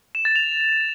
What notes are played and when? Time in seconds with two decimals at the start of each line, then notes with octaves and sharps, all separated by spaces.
0.15 E7
0.25 A6
0.36 F7